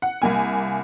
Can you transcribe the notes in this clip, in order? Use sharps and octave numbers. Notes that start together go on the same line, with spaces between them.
F#5
C2 A#3 G#5